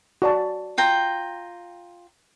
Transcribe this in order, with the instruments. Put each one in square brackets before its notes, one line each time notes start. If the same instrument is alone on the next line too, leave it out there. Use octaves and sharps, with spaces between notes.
[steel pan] F#4 D5 A5
[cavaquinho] F4 G5 A#5